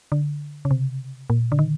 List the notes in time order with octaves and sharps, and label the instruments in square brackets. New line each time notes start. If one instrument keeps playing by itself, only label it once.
[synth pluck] D3
C#3
C3
A#2
D3
D#3